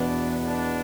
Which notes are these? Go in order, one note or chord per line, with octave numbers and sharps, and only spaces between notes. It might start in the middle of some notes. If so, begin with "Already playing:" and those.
Already playing: E2 B2 B3 D4
D4